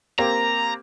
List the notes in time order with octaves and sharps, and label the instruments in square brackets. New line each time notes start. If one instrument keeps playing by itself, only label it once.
[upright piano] A#3 C4 G4 [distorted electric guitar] A#5